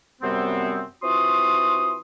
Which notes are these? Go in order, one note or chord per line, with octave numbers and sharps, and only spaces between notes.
F#2 C3 G3 B3 C4
E3 C4 F4 F#4 C6 D#6